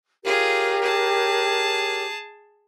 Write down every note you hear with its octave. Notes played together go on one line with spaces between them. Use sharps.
F4 G4 G#4 A#4 C#5
G#4 A5